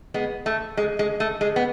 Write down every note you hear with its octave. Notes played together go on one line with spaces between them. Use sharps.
G#3 B3
A3
G#3
G#3
A3
G#3
B3